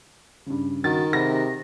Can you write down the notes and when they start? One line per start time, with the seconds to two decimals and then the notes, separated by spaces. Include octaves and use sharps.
0.46 G2 C#3
0.84 D#3 F#4 A6
1.13 C3 G#4 F#5 B5 A#6